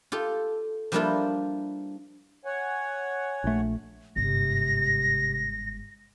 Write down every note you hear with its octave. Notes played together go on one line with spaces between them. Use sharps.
F4 G4 A4
F3 G3 A#3 D4 E4 F4
C#5 F#5 G#5
A#1 A3
G1 G#2 C3 A#6